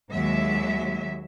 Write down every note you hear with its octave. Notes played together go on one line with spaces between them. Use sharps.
D#2 F#3 G#3 E5